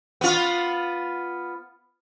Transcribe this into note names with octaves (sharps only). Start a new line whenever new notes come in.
B3 F4